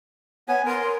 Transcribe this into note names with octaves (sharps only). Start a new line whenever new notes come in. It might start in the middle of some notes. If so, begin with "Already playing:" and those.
B3 C#5 G#5
A#4 C6